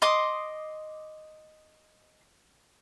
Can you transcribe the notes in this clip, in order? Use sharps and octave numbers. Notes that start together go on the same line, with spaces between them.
D#5 C6 D6 D#6